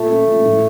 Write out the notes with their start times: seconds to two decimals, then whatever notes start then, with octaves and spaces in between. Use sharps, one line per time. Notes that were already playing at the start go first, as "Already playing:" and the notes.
Already playing: A#2 A3
0.09 C#4
0.28 A#2
0.45 A2